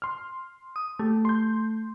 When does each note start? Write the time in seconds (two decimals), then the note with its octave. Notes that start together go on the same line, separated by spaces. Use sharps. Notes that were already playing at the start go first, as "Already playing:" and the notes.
0.02 C6 F6
0.76 D#6
0.99 A3 G4
1.25 C6 G6